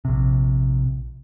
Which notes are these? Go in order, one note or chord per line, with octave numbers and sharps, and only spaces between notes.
A#1 C3